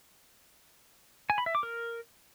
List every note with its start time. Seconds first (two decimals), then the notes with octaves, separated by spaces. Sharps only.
1.30 G#5
1.38 B5
1.46 E5
1.55 D6
1.63 A#4